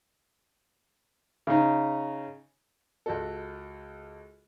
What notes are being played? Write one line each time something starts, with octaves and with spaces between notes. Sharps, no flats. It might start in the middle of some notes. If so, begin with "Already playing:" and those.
C#3 D#4
C#2 F#4 A4